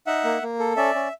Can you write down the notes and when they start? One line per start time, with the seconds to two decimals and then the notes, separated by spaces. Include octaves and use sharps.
0.07 D#4 E5 F#5
0.24 A#3
0.42 A#3
0.59 A4
0.77 C#4 D5 E5
0.95 C#4